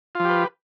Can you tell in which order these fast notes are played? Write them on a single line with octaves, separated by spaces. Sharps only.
F4 F3 G4 B4